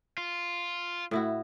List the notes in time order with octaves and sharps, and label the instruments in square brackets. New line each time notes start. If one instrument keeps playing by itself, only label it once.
[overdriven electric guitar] F4
[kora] A2 E4 F#4